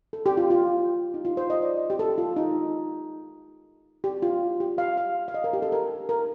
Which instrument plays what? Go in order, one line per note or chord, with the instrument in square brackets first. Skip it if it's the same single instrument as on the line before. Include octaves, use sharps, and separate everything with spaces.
[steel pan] A4
G4
F4
F4
D#4
F4
C5
D#5
D5
G4
A4
F4
D#4
G4
F4
G4
F5
F5
F5
D#5
A#4
G4
A4
A#4
A#4